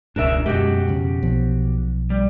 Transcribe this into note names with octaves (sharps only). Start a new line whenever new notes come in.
E1 C#2 G#2 D4 A#4 E5
F#2 B2 G#3 F#4 G4
F2 C#3
B1 F3 B3
G3